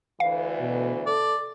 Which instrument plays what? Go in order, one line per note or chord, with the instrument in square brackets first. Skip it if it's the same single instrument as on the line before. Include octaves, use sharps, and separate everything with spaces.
[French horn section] D2 E3 [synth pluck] F5
[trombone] B2
[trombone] A4 [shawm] D5